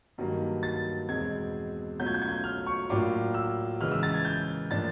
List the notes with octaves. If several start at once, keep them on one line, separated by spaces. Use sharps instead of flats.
G2 D#3 F#3 A#3
A6
E2 B2 G#3 C4 G#6
B2 F#3 A3 C#4 F4 G6
G#6
G6
G#6
G6
F6
C#6
A2 F#3 A#3 D4 F4 D6
E6
C#3 E3 G#3 F6
E6
A6
G#6
G6
A2 F3 A#3 D4 A6